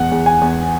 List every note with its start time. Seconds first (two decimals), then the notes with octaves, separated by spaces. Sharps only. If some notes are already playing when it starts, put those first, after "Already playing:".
Already playing: E2 F#5
0.11 E2
0.26 G#5
0.41 E2